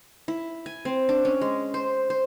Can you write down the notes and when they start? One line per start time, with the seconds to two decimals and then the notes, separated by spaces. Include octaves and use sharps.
0.28 E4
0.66 G#5
0.85 C4
1.09 D4
1.25 C#4
1.41 G#3
1.74 C5
2.10 C5